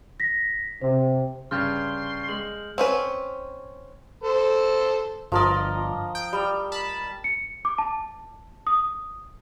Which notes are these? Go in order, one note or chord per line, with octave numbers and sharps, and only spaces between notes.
A#6 B6
C3 C5
G2 C#3 C6 F6 G6
G#3 F#7
C4 C#4 B4
A4 C5
G1 F3 A#4 D5 D#5
G5
G3
A5 B5
C#7
D6
A5
D#6